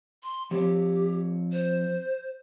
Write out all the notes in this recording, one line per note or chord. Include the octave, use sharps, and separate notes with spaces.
C6
F3 C4 G4 C#5
C5